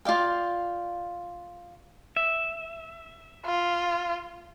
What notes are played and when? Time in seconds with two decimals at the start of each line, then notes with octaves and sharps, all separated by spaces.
0.05 F4 D5 F5 G5
2.17 E5
3.45 F4